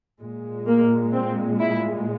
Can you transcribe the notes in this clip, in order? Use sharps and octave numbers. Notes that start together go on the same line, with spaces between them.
A#2 G#3
A#3
C4
E4